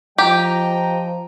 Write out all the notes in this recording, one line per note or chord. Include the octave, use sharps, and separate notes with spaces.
F3 G4 D#5 G5 A#5